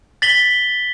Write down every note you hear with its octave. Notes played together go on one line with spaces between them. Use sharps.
A6 B6 F#7 G7